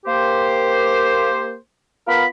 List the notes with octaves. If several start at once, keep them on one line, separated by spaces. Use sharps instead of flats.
A#3 G4 C5
B3 F4 A#4 B5